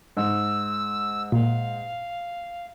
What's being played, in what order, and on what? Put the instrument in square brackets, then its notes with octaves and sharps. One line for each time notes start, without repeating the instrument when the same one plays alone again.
[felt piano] G#2 [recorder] E6
[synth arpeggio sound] A#2 [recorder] F5